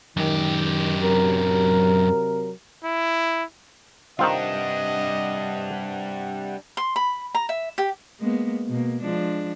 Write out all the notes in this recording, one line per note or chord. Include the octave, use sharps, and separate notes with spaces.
F#2 D#3 G4
C3 F#3 A#4
E4
C3 D#3 G3 C4 D4 F4 D#5 F#5
C6
B5
A#5
E5
G4
G#3 A#3 B3
B2 A#3
F3 G#3 D4